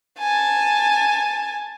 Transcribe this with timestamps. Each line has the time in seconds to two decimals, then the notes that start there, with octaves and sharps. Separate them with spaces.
0.18 G#5 A5